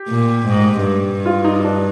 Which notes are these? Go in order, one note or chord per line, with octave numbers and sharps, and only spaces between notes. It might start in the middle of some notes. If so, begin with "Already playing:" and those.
Already playing: G4
A#2
G#2
G2
F4
D#4
D4